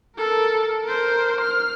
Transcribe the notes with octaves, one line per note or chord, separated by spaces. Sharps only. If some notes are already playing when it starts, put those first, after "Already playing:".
A4 A#4
A#4 C5
F6